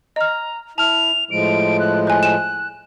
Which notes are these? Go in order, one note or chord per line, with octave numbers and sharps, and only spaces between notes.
D#5 A#5 F6
E4 A5 F6 F7
A2 F3 G#3 D7
F#6
C5 G#5 F#6
G#5 E7